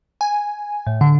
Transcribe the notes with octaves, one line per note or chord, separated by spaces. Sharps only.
G#5
A2
D3